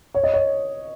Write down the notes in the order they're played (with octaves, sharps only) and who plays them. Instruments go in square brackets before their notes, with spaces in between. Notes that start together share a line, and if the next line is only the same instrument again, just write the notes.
[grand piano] C#5
D#5
C#5